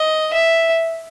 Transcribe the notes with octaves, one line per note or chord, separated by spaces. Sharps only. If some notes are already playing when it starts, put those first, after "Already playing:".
Already playing: D#5
E5